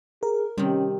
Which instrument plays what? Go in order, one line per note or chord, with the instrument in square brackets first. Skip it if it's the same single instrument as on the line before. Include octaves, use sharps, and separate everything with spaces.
[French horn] G#4 [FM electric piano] A#4
[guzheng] C3 D#3 [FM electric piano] G3 [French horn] C#4